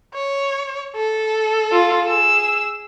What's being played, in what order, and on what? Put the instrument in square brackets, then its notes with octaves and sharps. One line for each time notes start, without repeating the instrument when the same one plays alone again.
[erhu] C#5
A4
[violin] F4
G#4 E6